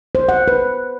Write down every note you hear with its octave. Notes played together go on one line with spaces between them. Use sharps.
C5
F#5
B4